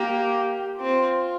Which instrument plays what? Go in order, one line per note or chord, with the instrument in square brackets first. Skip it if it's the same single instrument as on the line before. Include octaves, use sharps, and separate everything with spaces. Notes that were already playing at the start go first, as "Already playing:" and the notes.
Already playing: [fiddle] A#3 [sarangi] G4
[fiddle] C4 [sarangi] F4